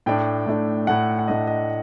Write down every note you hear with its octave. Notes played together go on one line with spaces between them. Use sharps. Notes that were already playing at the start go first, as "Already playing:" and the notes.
A2 A3 D4 G5
A2 A3 D4
A2 A3 D4 F#5
F#5
A2 A3 D4 D#5
D#5